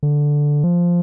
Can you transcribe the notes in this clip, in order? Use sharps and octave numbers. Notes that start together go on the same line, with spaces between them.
D3
F3